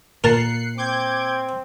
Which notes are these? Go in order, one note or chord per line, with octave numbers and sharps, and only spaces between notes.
A#2 A#4 A5 F#6 C7 C#7
C4 D6 G6 G#6